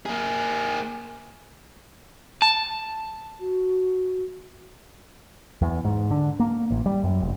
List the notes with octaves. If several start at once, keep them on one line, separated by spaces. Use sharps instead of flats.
A#3 G#4
A5
F#4
E2
G#2
D3
A#3
A1
G3
F#2
F1